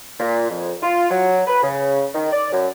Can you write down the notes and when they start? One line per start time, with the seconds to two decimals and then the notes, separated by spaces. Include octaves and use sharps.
0.20 A#2
0.49 F2
0.82 F4
1.10 F#3
1.47 B4
1.62 C#3
2.14 D#3
2.32 D5
2.51 F#2